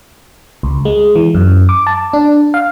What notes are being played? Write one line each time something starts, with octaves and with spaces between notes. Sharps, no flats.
C#2
G#3
E3
F#2
D6
A5
D4
F5